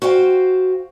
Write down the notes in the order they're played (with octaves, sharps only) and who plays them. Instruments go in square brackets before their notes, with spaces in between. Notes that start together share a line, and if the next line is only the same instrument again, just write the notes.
[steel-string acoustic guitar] F#4 C5 F5 G5